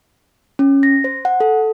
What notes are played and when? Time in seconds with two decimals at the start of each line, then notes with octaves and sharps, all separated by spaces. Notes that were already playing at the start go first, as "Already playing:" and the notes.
0.59 C#4
0.83 A#6
1.04 C5
1.25 F#5
1.40 A4